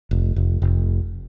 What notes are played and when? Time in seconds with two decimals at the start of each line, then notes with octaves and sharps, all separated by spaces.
0.11 F1
0.36 F1
0.62 F1